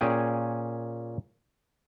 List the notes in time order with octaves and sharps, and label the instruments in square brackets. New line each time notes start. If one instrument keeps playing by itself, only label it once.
[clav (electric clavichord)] A#2 C#4 G#4 G5